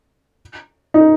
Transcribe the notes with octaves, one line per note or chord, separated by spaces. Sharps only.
D#4